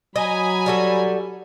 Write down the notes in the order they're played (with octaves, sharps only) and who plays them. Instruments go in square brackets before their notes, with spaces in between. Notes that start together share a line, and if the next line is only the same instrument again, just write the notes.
[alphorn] F#3 [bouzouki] D#5 [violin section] G#5 A#5 B5
[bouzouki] G3 F#4 A4